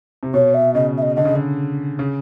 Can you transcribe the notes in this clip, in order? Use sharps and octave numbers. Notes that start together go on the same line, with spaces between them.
C3
B2 C#5
E5
C#3 D#5
E5
D#5
D3 D#5
C#3
D3
C#3